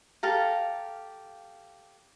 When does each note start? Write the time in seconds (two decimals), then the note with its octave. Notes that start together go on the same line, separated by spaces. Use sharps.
0.23 G4 A4 F5 A#5